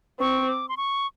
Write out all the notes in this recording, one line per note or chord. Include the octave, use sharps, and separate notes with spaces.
C4 C#6
D6
C6
C#6